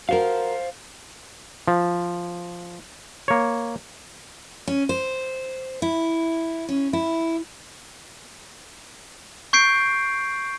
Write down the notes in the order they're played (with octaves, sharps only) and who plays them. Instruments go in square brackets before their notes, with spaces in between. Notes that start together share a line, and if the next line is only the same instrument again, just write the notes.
[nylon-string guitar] F#4 A#4 [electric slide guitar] C5 F5
[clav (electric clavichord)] F3
A#3 C#5
[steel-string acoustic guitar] C#4
C5
E4
C#4
E4
[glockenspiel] C#6 G6 C7 D7